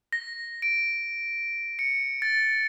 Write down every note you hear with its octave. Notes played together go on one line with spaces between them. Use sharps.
A#6
D7
C#7
A6